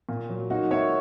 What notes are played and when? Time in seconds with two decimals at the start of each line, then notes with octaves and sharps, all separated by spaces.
0.09 A#2
0.29 F#3
0.50 A#3 D#4 F#4
0.71 A#3 C#5 E5